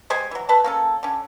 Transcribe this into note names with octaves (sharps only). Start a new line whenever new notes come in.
G#3 G4 C5 G#5
E3 F#3
A3 B4 A5
A#3 C#4 A4
D3 C#4